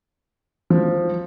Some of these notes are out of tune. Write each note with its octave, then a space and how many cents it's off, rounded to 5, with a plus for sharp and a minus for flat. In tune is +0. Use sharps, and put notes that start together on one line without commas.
F3 +0